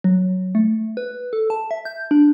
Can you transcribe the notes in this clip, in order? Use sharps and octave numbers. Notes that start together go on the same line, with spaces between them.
F#3
A3
B4
A4
A5
E5
G6
D4